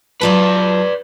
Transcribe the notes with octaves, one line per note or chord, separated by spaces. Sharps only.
F#3 F4 B4 D5 A5